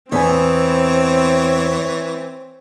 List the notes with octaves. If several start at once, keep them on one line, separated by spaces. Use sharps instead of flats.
E2 E3 B3 C4 C#5 G#5